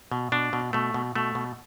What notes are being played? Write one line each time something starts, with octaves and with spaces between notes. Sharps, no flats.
B2
B2 D4
B2
B2 A3
B2
B2 A3
B2